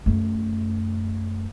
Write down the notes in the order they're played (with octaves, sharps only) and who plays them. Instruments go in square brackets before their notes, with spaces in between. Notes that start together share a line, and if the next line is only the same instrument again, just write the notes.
[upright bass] F#2 A3